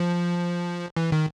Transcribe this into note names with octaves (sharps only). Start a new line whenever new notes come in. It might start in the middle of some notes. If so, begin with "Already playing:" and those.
Already playing: F3
E3
D#3